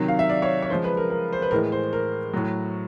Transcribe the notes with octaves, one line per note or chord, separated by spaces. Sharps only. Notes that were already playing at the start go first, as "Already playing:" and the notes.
Already playing: C3 D#3 F#3
F5
E5
D5
C#5
C#5
C#3 F3 G#3 C5
B4
A#4
A#4
C5
B4
A2 E3 G#3 A#4
C5
A#4
A2 F#3